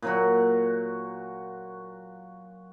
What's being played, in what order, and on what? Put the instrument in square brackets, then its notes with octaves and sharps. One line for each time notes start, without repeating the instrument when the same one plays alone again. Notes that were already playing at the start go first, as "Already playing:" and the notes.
[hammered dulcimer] A#2 F#3 F#4